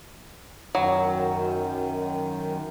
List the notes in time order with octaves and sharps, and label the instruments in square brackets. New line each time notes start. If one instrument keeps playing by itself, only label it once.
[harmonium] F#2 D#3 [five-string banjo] F#3